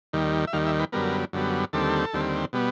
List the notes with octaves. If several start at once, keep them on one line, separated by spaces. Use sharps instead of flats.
D#2 D#3 G3
E5
D#2 D#3 G3 F5
E5
B4
F#2 D3 G3 B3 A#4
F#2 D3 G3 B3
D#2 D3 G3 C4 A4
D#2 D3 G3 C4
B2 G3 B3